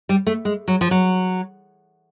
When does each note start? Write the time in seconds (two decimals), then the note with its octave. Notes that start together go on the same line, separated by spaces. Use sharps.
0.09 G3
0.27 A3
0.45 G#3
0.68 F#3
0.81 F3
0.91 F#3